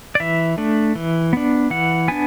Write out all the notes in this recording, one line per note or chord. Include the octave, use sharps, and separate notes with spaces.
D5
E3 E5
A3 D4
E3
B3 D4
E3 F#5
B3 D4 G#5